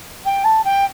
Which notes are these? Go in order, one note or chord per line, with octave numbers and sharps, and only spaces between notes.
G5
A5
G5